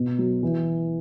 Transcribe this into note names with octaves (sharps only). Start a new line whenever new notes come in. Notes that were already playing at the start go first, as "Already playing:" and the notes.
Already playing: B2
F#3
E3